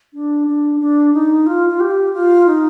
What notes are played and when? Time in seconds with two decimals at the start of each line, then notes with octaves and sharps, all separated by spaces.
0.13 D4
0.47 D4
0.80 D4
1.14 D#4
1.46 F4
1.70 F4
1.80 G4
2.14 F4
2.47 D#4